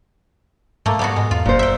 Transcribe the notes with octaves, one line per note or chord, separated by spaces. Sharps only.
G#2 A3 A#3
G3 B3 F#4
G#3
E2 F4
F#1 A#2 C5
E5 G5